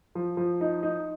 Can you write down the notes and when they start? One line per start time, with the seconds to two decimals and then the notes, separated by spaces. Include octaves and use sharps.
0.15 F3
0.37 F3
0.61 D#4
0.83 D#4